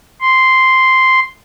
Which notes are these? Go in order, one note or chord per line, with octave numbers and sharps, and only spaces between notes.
C6